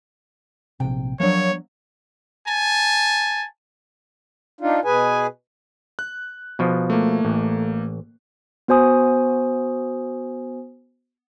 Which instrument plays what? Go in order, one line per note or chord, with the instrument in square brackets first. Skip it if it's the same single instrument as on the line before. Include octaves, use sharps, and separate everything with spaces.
[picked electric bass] A#1 C3 [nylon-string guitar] G5
[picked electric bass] F3 D4 [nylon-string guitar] F#3 A#3 [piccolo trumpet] C#5
[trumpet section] G#5 A5
[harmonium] D4 D#4 F4
B2 G#4 B4 G#5
[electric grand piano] F#6
[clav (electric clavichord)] B2 F3
[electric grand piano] A3 A#3
[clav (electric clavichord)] A1
[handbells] B3 F#4 C5 G#5 D#6